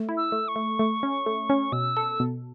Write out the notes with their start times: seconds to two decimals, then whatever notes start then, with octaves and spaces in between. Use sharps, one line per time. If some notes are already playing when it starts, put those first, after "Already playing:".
Already playing: A3
0.09 E4
0.17 E6
0.32 A3
0.48 C#6
0.56 A3
0.79 A3
1.03 C#4
1.26 A3
1.50 C#4
1.72 B2 E6
1.97 A4
2.20 B2